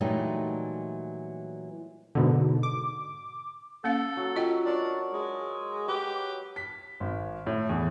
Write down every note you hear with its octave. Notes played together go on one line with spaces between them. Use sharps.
A#2 E3 F#3 G3 A3 D#4
G#2 B2 D3
D6
A#3 C#4 A4 F5
F#3
F4 D#5 G5
D4 A#4 C#5
G#3
G4 B4
B6
G#1
A2
E2